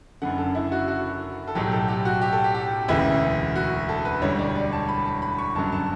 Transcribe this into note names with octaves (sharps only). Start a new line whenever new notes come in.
F#1 F#2 D3 F#5
A4
E4
F#4
F#4
A4
B1 A2 F#3 G4
A4
G4
F#4
G4
A4
G4
G4
E1 D2 C#3 E3 E4
F#4
A4
B4
E1 D2 D3 G3 C#5
D5
D5
A5
B5
A5
B5
C#6
G1 F#2 D3 F#3 A5
A5